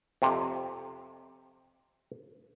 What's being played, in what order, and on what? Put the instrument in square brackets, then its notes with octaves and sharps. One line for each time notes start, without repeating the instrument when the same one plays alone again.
[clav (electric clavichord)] F2 C3